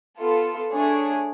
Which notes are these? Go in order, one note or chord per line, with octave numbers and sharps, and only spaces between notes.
B3 F4 A4
A3 D4 G#4 C#5